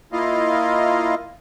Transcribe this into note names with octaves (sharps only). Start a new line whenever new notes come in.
A#3 E4 F4 D#5 F5